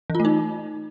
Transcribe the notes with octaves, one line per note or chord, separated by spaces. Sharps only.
E3
F4
A3
D#4